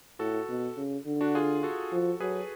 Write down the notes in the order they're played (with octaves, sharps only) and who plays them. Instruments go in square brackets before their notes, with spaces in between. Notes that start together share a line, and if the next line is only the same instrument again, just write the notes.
[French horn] A2 [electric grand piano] F#4 A4
[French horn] B2
C#3
D3
[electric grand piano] D4 F#4
F4 G#4
F#4 A4
[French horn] F3
[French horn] F#3 [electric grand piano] G#4 B4